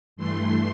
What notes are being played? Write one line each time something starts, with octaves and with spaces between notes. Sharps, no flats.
G2 E3 A3 C6